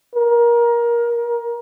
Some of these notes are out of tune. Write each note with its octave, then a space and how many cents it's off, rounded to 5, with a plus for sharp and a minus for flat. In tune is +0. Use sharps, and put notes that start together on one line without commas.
A#4 +20